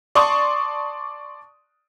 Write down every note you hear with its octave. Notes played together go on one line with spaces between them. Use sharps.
D5 A5 C6 C#6 D#6